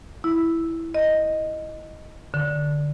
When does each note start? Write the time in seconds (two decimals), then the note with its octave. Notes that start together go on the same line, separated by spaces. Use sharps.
0.24 E4
0.95 D#5
2.34 D3